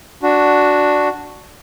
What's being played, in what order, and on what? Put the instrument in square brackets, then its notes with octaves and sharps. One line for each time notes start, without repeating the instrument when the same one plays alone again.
[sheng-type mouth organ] D4 F#4